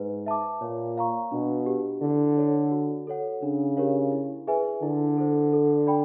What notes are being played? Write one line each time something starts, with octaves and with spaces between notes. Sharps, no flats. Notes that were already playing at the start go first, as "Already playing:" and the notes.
Already playing: G#2 B4
E5 A5 D6
A#2 C#5
F5 A#5 C#6
B2 D4
G4 B4
D3 E4
A4 C#5
F#4
A4 C#5 F#5
C#3 D4
G4 A#4 C#5 F5
E4
G#4 B4 E5 G#5
D3 E4
A4 C5
A4
D5 G5 B5